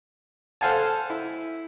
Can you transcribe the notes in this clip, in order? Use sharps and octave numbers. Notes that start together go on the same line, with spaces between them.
A4 C5 F5 F#5 G#5 A5
E4